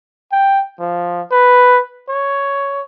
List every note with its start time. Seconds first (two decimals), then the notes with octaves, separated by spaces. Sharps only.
0.32 G5
0.79 F3
1.31 B4
2.09 C#5